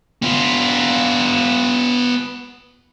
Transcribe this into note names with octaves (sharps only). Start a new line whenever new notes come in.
B3 F4